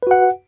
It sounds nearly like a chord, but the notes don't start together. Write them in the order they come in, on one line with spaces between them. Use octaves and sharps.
B4 F#4 F#5